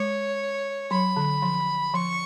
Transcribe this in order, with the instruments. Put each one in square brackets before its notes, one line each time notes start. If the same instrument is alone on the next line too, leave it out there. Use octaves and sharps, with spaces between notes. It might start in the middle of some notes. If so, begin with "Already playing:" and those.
Already playing: [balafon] G#3 [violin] C#5
[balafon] F#3 [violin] B5
[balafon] D3
F3
[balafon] F3 [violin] C#6